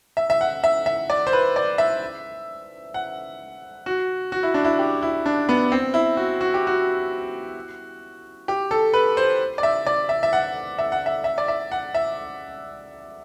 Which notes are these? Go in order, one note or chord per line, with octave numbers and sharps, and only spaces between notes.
E5
E5
F#5
E5
E5
D5
C5
B4
D5
E5
F#5
F#4
F#4
E4
D4
E4
G4
E4
D4
B3
C4
E4
F#4
F#4
G4
F#4
G4
A4
B4
C5
D5
E5
D5
E5
E5
F#5
E5
F#5
E5
E5
D5
E5
F#5
E5